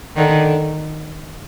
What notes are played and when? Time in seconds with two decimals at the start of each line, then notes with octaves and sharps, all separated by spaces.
0.16 D3 D#3